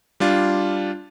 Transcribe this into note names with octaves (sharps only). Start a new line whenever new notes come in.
G3 D4 F4